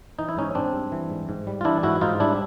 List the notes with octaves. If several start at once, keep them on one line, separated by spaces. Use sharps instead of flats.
E3 D#4
E4
G#2 C#4 D#4
G#2 C4 D4
G3
E3
G#2
G#2
G3
F4
E3 D4 E4
G#2 E4 F#4
G#2 D#4 F4
G3 D4 E4